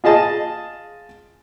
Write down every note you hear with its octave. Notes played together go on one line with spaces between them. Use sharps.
F4 G#4 D#5 A5